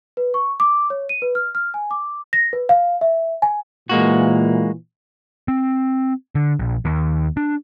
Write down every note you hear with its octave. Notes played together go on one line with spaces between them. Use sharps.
B4
C#6
D6
C#5
D#7
B4
F6
F6
G#5
D6
A#6
B4
F5
E5
G#5
A#2 E3 G#3 A#3 F#4
C4
D3
A#1
D#2
D4